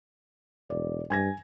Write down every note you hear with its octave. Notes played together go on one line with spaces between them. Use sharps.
E1 D5
G2 G#5 G#6 A#6